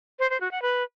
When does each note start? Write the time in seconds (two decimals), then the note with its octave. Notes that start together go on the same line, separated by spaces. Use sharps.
0.19 C5
0.30 C5
0.41 F#4
0.51 F#5
0.62 B4